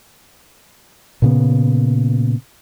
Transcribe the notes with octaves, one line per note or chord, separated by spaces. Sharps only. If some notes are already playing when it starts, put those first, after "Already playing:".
A#2 C#3 B3